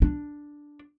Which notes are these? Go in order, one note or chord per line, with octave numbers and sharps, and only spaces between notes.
D4